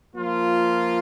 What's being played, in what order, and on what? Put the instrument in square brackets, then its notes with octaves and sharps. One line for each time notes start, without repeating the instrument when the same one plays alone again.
[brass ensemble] F3 A#3 F4